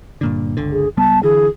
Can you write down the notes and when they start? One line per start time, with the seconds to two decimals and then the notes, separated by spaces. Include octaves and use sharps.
0.21 G2 A#2 D3
0.57 G1 C#2 D3
0.72 G#4
0.97 C#2 G3 B3 A5
1.23 D3 E3 G#4